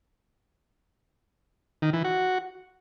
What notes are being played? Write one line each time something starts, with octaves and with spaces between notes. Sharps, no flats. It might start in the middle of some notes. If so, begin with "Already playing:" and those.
D#3
E3
F#4